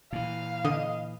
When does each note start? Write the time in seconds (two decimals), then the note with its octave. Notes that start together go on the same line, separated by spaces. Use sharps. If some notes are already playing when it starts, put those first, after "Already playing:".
0.13 A#2 E3 F5
0.65 D3 D#5